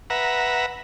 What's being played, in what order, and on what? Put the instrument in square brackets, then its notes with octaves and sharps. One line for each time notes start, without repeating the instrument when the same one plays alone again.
[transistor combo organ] B4 E5 F#5 A#5